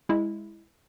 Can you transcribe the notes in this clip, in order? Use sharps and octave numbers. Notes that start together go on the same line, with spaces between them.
G#3 E4